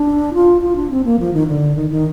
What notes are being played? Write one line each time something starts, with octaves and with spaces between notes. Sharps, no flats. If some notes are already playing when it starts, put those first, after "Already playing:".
Already playing: D4
F4
F4
D4
C4
A#3
F3
D#3
D3
D#3
D#3